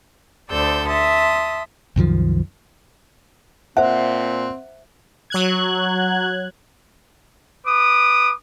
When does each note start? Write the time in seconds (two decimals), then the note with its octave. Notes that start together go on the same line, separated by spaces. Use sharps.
0.50 D2 A4 C5 D5 E6 G6
0.88 E5 A5 C6 D#6
1.96 C2 F#2 D#3 F3
3.77 A#2 C4 C5 E5 F#5
5.30 F#3 F#6 G#6
7.66 B4 D6 D#6